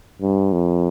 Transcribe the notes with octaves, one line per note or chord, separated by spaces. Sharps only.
G2
F2